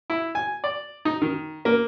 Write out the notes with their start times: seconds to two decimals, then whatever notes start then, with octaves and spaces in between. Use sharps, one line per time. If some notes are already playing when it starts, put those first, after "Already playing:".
0.10 E4
0.35 G#5
0.64 D5
1.05 D#4
1.22 D#3
1.65 A#3